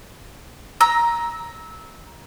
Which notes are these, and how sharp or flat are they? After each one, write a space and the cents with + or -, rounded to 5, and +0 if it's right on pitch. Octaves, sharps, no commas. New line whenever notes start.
A#5 +10 E6 -20